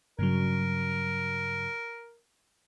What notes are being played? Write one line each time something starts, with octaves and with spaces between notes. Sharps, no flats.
G2 C#3 F#3 A#4